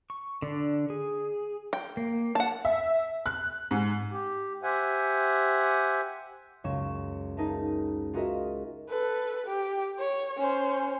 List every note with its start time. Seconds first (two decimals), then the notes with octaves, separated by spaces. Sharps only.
0.10 C#6
0.42 D3 D4
0.90 G#4
1.73 G5
1.97 A#3
2.35 F#5 A5
2.65 E5
3.26 F#6
3.71 G#2
4.11 G4
4.63 G4 C5 E5 F#5 G#5
6.64 C#2 F#2 C#4 C#6 E7
7.37 D#4 G#4 A#4 E5 A5
8.13 F4 F#4 G#4 A#4 D#5 E5
8.89 A4 B4
9.46 G4
9.99 C#5
10.38 C#4 C5